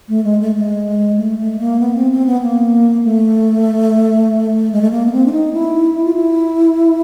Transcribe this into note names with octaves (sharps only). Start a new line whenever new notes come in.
A3
G#3
A3
G#3
A3
A3
A#3
B3
C4
C4
B3
A#3
A3
G#3
A3
A#3
B3
C4
D4
D#4
E4
F4
E4